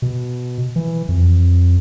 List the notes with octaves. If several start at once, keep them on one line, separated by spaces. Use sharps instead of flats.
B2
E3
F2